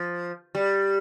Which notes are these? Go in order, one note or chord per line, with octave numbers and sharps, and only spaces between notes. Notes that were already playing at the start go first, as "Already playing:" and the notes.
Already playing: F3
G3